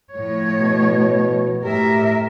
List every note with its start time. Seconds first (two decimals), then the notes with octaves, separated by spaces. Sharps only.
0.12 A2 F3 C#5
0.61 B2
1.63 A2 G4 A#4 E5